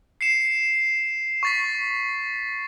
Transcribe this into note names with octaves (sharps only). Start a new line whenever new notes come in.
C7 C#7 E7
C#6 A6 B6